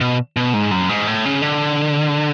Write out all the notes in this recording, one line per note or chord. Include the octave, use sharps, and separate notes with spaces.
B2
B2
G#2
F#2
G#2
A2
C#3
D3